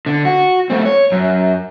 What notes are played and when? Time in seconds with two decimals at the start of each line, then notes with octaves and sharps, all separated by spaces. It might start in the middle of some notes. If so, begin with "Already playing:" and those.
0.06 D3
0.25 F#4
0.70 A3 C4
0.85 C#5
1.12 F#2